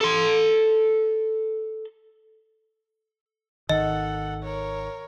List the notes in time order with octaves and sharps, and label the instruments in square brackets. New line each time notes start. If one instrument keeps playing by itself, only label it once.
[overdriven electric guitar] A4 C6
[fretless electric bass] G#1 D#3 [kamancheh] A4 F#5 [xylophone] D#5
[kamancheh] A#4 C#5